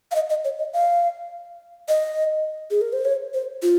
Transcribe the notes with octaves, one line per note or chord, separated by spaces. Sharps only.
F5
D#5
D#5
C#5
D#5
F5
D#5
G#4
A#4
C5
C#5
C5
F4